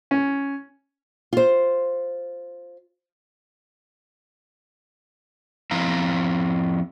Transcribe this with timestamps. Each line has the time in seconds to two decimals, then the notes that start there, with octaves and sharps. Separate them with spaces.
0.11 C#4
1.33 F4 C5
5.71 F3 C4 E4 F5 A#5